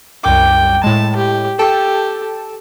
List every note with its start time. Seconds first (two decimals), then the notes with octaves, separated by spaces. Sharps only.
0.24 C2 F#2 G5 D6
0.84 A2 G#3 A5
1.16 G4
1.59 G4 A4 G5 A5